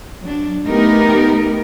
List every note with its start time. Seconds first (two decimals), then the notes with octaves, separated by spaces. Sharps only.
0.22 F#3 D4
0.65 A3 B3 D#4 G4 A#4